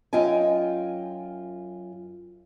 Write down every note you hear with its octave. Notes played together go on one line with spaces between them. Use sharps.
F#2 F4 D#5 G5 G#5